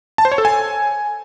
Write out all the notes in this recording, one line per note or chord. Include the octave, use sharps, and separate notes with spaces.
A5
C5
C#5
A4
G#5